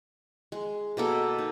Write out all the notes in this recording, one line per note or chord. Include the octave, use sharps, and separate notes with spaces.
G#3
B2 A#3 A4
D#4